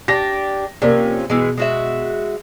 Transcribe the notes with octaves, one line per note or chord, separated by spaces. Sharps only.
D4 G4 A#6
C3 F3 A#3 C#4 D5
B2 E3 G#3
G#3 F#4 E5